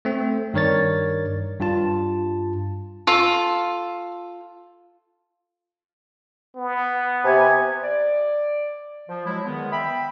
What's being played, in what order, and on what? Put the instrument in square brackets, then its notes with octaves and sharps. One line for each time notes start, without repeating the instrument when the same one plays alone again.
[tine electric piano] A3 C4
G2 D#3 A#4 C#5 D5 A6
G2 F4 A5
[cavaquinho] F4 A4
[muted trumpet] B3
[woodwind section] C3 G#5
D5
F3
F#3 G#3 E4
E2 D#3 G#3 B3
E5 G5 B5